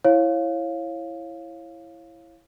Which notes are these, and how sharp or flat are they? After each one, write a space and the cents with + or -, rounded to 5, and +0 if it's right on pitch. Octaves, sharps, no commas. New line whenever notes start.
E4 +10 C#5 -25 F5 +0